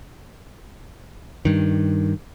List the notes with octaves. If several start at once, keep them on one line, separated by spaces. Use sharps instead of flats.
G2 D#3